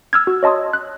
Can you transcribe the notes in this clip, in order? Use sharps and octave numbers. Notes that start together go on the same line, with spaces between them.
E6 F6 G#6
F#4
C#5 D#5 A5 C6 D#6
F#6